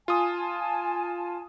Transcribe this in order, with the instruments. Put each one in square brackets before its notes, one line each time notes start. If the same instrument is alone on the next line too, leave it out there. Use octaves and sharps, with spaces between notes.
[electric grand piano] F4 D#6 [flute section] G#5 A5